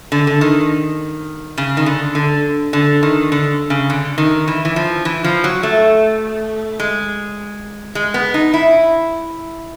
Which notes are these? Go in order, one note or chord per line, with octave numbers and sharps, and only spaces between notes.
D3
D3
D#3
C#3
D#3
D3
D3
D3
D#3
D3
C#3
D3
D#3
E3
E3
F3
E3
F3
F#3
A3
G#3
G#3
B3
D#4
E4